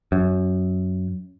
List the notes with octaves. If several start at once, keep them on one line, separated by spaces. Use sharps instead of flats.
F#2